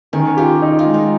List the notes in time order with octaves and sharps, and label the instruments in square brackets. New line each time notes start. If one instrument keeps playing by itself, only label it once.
[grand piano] D#3 [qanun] C#4
[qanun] F4 [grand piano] G4
[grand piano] D#4
[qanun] F4
[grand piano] G#3
[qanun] D#4